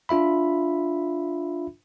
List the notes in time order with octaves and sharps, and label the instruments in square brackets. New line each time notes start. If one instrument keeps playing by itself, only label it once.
[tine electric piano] D4 F4 E5 B5